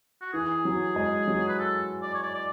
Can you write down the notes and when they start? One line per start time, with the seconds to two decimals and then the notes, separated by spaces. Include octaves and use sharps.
0.21 F#4
0.33 E3 G#4
0.65 F#3
0.96 G#3
1.28 F#3
1.48 B4
1.59 A4
2.02 D5
2.14 C#5
2.23 D5
2.34 D5